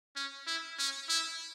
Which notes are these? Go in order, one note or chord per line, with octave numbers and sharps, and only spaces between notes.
C#4
E4
C#4
E4